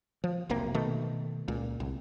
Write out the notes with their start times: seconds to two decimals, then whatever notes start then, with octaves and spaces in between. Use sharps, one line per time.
0.24 F3
0.49 E1 B1 C3 A#3
0.74 B2 D#3 A3
1.48 C#2 A#2
1.80 C2